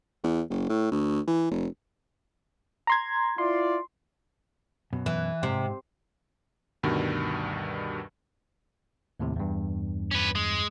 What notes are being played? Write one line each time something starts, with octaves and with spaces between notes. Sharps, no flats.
E2
F#1
A2
D2
E3
F1
A#5 C6 G#6
E4 F4 D5 C6
F#2 B2
E3
G#2 C3
D2 G2 B2 D#3 G3
D#2 A2 C3
E2 G2
C#4 B4
G#3